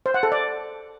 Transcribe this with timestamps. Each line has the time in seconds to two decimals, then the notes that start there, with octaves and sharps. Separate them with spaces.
0.06 C5
0.14 F#5
0.23 A4
0.32 D5